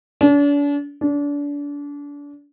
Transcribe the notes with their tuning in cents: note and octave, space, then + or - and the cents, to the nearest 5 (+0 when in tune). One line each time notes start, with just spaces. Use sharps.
D4 -40
D4 -30